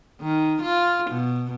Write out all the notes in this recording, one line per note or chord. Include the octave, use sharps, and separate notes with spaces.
D#3
F4
B2